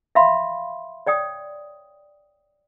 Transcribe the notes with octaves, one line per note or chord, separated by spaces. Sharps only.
E5 F5 B5 C6
C#5 D5 G5 D#6